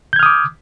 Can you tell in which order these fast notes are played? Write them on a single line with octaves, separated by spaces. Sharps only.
G6 G#6 F6 D#6 D6